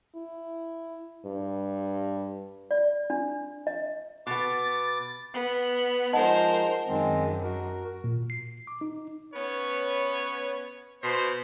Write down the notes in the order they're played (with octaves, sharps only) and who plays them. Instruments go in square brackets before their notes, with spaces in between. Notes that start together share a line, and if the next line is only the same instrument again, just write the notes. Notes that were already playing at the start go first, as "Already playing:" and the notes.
[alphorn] E4
G2
[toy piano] D5
D4
D#5
[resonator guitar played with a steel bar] B2 B3 [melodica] D6 [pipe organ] A6
[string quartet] B3
[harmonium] F3 G#3 D#4 [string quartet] A#4 C5 [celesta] D#5 F#5 A5
[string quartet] F#2 [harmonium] D#3 G#3 C4
[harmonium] F#4 A#4
[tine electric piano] A#2
C7
D6
D#4
[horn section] B3 C#4 B4 C#5
B2 C5